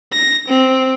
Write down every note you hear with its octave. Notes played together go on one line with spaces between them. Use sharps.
A#6
C4